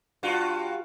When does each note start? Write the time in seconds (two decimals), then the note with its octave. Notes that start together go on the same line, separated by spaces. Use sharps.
0.23 G2 F4 F#4